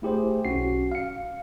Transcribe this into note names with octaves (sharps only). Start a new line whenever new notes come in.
A3 E4 G4 G#4 C5
B1 C#4 F#4 C7
F5 C#7